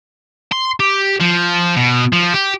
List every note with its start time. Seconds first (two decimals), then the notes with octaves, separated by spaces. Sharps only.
0.52 C6
0.80 G4
1.21 F3
1.76 B2
2.13 F3
2.33 G4